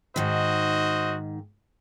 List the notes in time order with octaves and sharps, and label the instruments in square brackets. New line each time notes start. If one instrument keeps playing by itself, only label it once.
[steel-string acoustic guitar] G#2 D#3 [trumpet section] F#4 C5 D#5